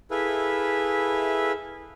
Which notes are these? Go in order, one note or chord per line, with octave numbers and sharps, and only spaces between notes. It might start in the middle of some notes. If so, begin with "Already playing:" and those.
E4 G#4 A4 B4 E5 F5